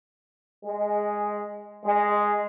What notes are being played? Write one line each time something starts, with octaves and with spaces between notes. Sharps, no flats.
G#3
G#3